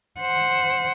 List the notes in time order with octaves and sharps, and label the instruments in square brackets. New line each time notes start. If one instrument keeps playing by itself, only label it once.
[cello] C5 F#5